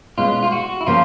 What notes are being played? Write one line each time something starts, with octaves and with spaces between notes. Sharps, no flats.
B2 G#3 C#4 F4
F4
F#4
E4
C#3 F3 A#3 F4